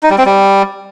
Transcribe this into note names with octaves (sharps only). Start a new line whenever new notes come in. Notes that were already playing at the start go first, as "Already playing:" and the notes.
D#4
G3
C4
G3